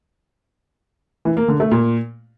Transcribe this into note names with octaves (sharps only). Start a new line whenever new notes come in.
E3
A#3
D3
A3
A#2